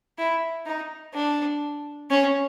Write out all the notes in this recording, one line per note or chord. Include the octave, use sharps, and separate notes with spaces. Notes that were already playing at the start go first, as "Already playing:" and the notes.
E4
D#4
D4
C#4